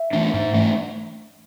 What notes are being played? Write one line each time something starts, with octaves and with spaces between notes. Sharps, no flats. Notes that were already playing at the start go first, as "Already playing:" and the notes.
Already playing: E5
E3 A3 D4
G#2
E3 A3 D4